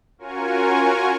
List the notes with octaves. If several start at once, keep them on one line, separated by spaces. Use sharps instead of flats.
C#4 F4 F#4 A#4 G#5 C#6